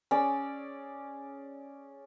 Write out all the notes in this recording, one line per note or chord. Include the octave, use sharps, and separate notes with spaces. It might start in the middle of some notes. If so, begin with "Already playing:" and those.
C#4 G#4 D5 E6